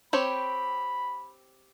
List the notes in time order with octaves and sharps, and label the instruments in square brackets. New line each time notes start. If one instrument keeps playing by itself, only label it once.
[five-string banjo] C4 G4 C#5 [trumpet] B5